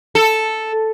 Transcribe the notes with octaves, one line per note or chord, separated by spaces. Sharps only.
A4